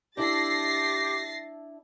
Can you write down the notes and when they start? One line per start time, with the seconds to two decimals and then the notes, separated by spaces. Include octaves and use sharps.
0.17 D4 E4 G4 A4 A6 A#6 C7